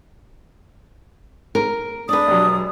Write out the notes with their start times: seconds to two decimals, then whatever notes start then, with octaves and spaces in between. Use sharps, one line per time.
1.55 A#4
2.09 D4 B4 D5 D#6
2.27 E1 F#3